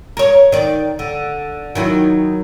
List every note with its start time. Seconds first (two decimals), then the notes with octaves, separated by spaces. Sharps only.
0.17 A#4 C#5
0.52 D#3 D5
0.99 D3
1.75 D#3 F#3 E4